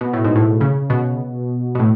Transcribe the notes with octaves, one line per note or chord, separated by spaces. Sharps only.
B2
A2
G#2
A2
C#3
B2
B2
A2